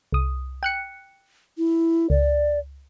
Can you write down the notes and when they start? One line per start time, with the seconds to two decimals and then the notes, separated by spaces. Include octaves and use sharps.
0.12 C2 D#6
0.63 G5 F#6 C#7
1.58 E4
2.10 C#2 D5